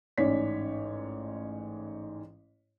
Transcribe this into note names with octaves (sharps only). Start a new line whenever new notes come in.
A1 G#2 C#4 C#5 D5 B6